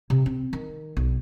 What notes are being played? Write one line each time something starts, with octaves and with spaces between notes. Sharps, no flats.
C3
C4
D#3
B1